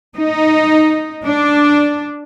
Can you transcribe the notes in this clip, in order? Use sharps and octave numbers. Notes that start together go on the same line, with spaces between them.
D#4
D4